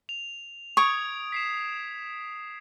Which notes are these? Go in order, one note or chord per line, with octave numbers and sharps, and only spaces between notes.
F7
C#6 D#6 G#6 D7
B6 C7 E7